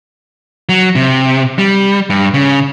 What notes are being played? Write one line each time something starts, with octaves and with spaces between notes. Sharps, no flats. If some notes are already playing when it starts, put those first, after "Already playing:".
F#3
C3
G3
G2
C#3